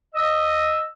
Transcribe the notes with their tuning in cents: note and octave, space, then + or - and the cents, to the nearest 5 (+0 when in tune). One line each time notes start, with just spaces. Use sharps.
D#5 -5 E6 +0